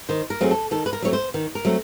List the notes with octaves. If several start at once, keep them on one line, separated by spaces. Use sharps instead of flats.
D#3 C5
A#4
F#3 A3 C4 G#4
A4
D#3 A4
B4
A#4
F#3 A3 C4 C#5
C5
D#3
A#4
F#3 A3 C4